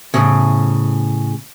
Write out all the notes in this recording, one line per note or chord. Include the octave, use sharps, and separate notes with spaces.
A2 C#3